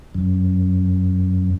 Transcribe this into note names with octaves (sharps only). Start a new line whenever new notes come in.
F#2